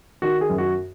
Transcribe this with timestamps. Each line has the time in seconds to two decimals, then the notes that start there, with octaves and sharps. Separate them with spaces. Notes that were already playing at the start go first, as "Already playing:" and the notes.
0.22 D#3 F#4
0.41 G#4
0.50 F#2
0.58 F#4